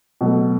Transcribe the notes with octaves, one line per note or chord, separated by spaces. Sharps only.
B2 F#3 A3